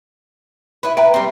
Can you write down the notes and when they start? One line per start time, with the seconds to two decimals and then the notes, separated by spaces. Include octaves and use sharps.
0.83 E4 B4
0.97 B4 E5 G5 A#5
1.14 G3 C4